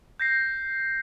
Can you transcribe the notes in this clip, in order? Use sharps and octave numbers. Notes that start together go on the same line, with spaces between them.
G6 A#6 C7